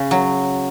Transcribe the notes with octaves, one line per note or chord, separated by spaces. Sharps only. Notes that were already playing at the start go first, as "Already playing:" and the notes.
Already playing: C#3
F#3